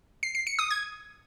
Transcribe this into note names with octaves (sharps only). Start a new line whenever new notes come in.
C7
C7
C#7
D#6
G#6